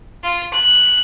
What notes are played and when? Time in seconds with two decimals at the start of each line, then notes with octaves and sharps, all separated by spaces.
0.24 F4
0.54 F#6